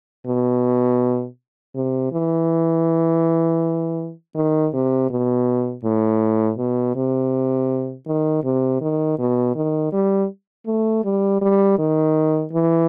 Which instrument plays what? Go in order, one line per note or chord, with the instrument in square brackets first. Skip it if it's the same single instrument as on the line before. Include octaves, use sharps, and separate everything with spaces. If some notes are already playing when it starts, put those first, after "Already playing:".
[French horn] B2
C3
E3
D#3
C3
B2
A2
B2
C3
D#3
C3
D#3
B2
D#3
G3
A3
G3
G3
D#3
E3